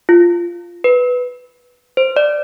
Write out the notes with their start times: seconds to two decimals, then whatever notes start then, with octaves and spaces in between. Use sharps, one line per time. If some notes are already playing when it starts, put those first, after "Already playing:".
0.09 F4
0.84 B4
1.97 C5
2.16 D5